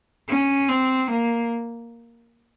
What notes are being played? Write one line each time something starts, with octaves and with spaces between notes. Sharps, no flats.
C#4
C4
A#3